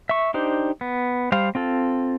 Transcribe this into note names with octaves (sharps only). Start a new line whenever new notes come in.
E5 C#6
D4 D#4 G4 C5
B3
G3 C5 F5
C4 F4 A4